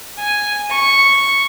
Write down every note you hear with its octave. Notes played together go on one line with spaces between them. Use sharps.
G#5
C#6